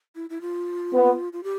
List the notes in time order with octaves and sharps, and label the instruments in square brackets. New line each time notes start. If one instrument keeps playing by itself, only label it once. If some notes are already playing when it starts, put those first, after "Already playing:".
[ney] E4
E4
F4
[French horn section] B3
[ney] F4
G4